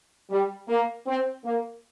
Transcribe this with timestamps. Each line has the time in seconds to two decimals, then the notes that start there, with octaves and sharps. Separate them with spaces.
0.31 G3
0.69 A#3
1.07 C4
1.45 A#3